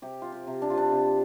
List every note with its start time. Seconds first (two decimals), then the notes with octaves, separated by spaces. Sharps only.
0.02 C3 G4
0.22 F3 F4
0.32 G4
0.47 C3
0.62 D4
0.70 F3 F4
0.78 D4
0.92 C3